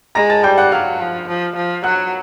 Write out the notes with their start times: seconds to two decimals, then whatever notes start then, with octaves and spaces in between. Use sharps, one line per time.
0.15 G#3 A#5 A#6
0.30 A5 A6
0.44 G3 G5 G6
0.58 F#5 F#6
0.72 F#3 F5 F6
1.00 F3
1.28 F3
1.56 F3
1.84 F#3 F#5 F#6